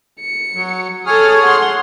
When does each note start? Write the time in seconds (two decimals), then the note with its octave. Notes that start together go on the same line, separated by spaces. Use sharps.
0.21 C#7
0.55 F#3
1.06 G#4 A4 C#5 D#6 F6
1.44 F#5 C6